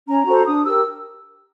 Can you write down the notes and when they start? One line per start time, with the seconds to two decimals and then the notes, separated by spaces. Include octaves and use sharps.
0.07 C#4 A#5
0.26 F#4 A4 C5
0.46 D4 D#6
0.65 G4 A#4 E6